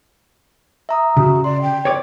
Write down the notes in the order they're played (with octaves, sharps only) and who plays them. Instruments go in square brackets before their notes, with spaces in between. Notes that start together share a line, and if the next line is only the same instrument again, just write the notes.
[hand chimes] E5 A#5 D#6
[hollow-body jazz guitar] C#3 [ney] F#4
[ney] D5 [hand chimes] C6
[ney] G5
[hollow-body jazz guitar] C#5 D5